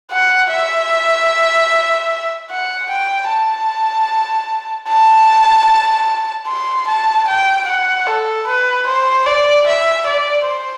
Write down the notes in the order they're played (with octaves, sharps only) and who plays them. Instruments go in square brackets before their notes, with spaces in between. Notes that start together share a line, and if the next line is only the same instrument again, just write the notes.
[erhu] F#5
E5
F#5
G5
A5
A5
C6
A5
G5
F#5
A4
B4
C5
D5
E5
D5
C5